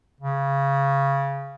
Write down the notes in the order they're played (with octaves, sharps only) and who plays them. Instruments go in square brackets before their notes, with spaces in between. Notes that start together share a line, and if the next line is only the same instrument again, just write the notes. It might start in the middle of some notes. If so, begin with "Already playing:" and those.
[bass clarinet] C#3